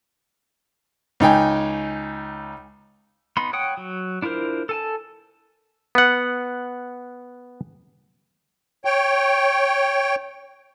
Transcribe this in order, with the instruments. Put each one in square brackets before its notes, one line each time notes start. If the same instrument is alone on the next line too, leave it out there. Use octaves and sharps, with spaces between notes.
[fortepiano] C#2 D#4 G5 G#5
[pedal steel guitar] B3 D#4 B5 C6
C#5 F#5 G5 D#6
F#3
D4 E4 F4 A#4 C5
A4 G#5 A5
[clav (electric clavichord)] B3 F#5
[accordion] C#5 G5